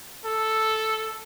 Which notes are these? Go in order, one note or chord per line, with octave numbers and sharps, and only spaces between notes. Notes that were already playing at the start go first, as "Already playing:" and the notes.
A4